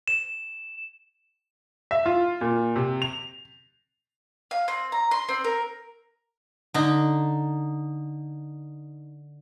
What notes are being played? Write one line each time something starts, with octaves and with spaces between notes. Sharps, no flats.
E7
E5
F4
A#2
C3
F7
F5
C4
A#5
C6
C4
A#4
D3 D#4